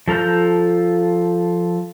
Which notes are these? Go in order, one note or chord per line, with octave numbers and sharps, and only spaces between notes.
F3 A4 A#5 F6 G6